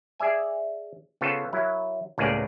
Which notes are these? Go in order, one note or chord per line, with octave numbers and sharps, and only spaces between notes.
G#4 D5 E5 G#5
C#3 B3 F4 A4 C5
F#3 E4 A#4
C#2 A2 A#3 B3 G#4 D5